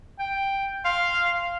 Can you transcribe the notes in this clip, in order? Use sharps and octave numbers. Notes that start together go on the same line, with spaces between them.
G5
F5 C6